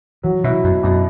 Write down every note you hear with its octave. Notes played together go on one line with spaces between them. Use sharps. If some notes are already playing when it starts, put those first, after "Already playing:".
E3 F#3
B2 E4
F#2 B2
F#2 B2